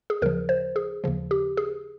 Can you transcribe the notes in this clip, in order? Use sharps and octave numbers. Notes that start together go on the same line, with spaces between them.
G#4
D#2 C#3 F3 A#4
C5
G#4
D#2 C#3 F3
G4
G#4